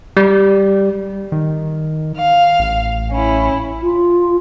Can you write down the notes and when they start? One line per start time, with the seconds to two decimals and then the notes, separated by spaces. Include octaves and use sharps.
0.17 G3
1.32 D#3
2.17 F5
2.59 A1
3.10 C#4 E4
3.82 F4